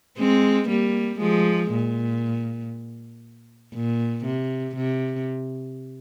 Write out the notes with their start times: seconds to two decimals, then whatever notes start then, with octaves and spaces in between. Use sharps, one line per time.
0.19 G#3 C4
0.69 G3 A#3
1.20 F3 G#3
1.71 A#2
3.74 A#2
4.25 C3
4.76 C3